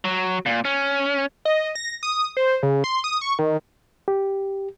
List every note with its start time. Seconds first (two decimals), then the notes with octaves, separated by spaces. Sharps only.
0.05 F#3
0.46 A#2
0.65 C#4
1.45 D#5
1.75 A#6
2.03 D#6
2.37 C5
2.63 C#3
2.84 C6
3.04 D#6
3.21 C#6
3.39 D#3
4.08 G4